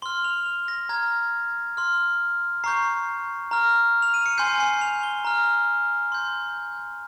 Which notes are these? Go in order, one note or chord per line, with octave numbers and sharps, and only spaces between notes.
C6 F6 G7
F7
F7
A#6
A#5 F6 G#6
C6 F6
A#5 C#6 G6 C7
A#5 F6
F7
D#7
C#7
G#5 C6 G6 C7
C7
F7
G7
A#5 F6
C6 G6